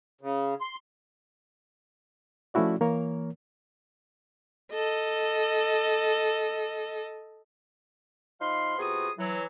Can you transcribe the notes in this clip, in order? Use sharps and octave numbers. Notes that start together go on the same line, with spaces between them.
C#3
C6
F3 A3 C#4 E4 F#4 D5
E3 A#3 A#4 C#5
A4 D#5
F3 D#4 F5 B5 C6
C3 B3 F4 F#4 G#4 D#6
E3 F#3